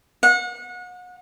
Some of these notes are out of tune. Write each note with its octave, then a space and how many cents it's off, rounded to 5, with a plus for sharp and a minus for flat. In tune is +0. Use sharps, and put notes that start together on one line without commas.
F#5 -35